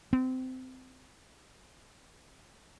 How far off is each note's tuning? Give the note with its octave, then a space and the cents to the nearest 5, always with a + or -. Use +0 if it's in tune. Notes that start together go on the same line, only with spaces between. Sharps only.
C4 -20